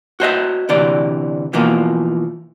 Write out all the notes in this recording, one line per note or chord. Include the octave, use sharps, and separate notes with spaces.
F#4 C5 D#5 E5
D2 C3 E3 D5
B2 E3 F3 A#3